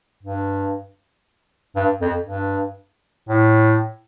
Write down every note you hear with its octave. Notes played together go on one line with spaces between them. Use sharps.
G2
G2
F2
G2
A2